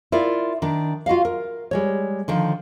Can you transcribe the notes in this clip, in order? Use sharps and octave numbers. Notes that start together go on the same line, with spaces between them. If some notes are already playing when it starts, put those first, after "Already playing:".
E4 F4 A#4 D5
D#3 D4
F4 F#4 D#5 F5
A#4
G3 G#3 C#5
D3 D#3 F3